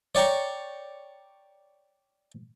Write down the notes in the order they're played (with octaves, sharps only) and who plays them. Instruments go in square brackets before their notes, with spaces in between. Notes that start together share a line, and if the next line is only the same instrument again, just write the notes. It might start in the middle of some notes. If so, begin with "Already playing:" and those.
[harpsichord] C#5 D5 G5 A#5 C#6